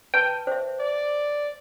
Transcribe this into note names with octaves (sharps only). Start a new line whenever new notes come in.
B4 G5 A5
C5 E5
D5